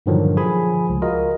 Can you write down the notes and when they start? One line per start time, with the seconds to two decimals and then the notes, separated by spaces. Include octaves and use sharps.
0.06 G2 A#2 D3 D#3 F3 F#3
0.37 F3 G#4 G#5 B5
0.90 C#2
1.02 F4 F#4 A#4 D#5